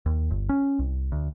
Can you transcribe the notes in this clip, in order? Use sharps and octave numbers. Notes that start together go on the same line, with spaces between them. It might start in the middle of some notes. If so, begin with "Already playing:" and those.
D#2
G1
C#4
C2
D2